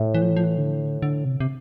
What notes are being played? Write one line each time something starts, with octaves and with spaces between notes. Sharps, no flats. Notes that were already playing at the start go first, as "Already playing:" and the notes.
Already playing: A2
E3
F3
E3
F3
E3
D3
D3
C3
C3